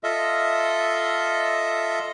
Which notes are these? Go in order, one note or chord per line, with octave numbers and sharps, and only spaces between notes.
F4 A4 D#5 E5